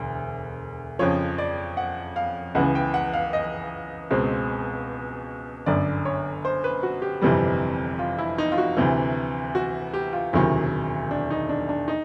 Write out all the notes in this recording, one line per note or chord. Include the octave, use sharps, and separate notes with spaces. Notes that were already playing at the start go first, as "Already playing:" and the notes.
Already playing: E1 D2
F2 C#3 F3 C#5
D5
F#5
F5
C#2 C#3 E3 F#5
G5
F#5
F5
D#5
C#2 B2 G#3 C4
G1 F#2 D3 D5
C#5
C5
B4
F#4
G4
G1 F2 C3 E3 G3
F4
E4
D#4
F4
F#4
D2 C3 E3
F#4
G4
F4
E1 D2 C3 D#3 F#3 E4
D4
D#4
D4
D4
D#4